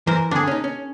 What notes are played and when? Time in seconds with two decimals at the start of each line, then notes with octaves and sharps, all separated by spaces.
0.07 E3 A#4 C5
0.31 D3 D4 G#4
0.47 C#4 D#4
0.64 C#4